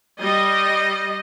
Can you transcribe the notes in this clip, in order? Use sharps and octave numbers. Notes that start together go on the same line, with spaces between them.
G3 D#5